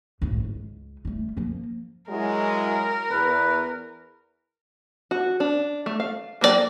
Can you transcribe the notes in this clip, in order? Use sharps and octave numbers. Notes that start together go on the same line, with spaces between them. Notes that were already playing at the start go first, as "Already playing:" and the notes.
G#1 A2
C#2
G3 A3
F3 A#3
F#3 G#3 E4 A#4
E2 B4
F#4
D4
A3
F5
F#3 A#3 B3 D5 G5